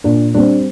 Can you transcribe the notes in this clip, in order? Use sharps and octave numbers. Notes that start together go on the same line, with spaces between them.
A#2 D4
G3 C4 D4